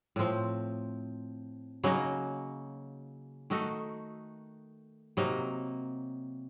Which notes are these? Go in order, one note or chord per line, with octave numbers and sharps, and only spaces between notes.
A2 F3 C4
C#3 F#3 A#3 D#4
D#3 A3 D#4 F#4
C3 F#3 A#3 D#4